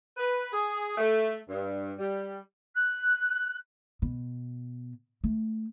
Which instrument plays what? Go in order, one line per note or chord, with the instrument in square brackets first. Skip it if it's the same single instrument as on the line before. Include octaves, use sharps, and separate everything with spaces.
[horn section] B4
G#4
A3
G2
G3
[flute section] F#6
[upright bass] B2
A3